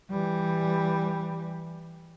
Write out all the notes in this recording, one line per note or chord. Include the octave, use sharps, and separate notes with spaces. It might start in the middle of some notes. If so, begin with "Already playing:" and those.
E3 G3